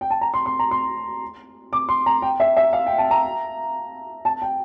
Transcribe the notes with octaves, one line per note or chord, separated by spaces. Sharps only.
G5
A5
A#5
C6
C6
A#5
C6
D6
C6
A#5
G5
E5
E5
F5
G5
A5
A#5
A5
G5